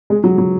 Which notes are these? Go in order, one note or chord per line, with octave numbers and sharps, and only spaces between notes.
G#3
F#3
F#3